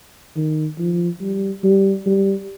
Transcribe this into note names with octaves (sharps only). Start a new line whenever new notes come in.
D#3
F3
G3
G3
G3